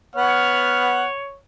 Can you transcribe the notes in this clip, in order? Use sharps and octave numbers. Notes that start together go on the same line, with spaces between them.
B3 C#5 F#5 F6